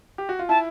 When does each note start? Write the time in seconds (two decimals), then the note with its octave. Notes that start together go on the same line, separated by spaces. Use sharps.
0.18 G4
0.29 F#4
0.39 F4
0.49 E4 A5